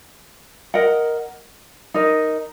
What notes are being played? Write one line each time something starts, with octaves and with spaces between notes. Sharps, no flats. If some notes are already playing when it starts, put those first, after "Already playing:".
A#4 D#5 F#5
D#4 A#4 D#5